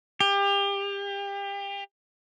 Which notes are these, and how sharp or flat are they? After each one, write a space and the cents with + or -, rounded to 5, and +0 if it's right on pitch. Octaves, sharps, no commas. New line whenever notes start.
G4 +30